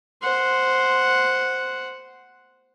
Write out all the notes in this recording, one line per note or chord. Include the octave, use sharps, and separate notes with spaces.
C5 F#5